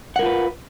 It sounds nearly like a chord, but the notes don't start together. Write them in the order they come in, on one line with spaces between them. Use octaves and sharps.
F#5 A#4 F4 B4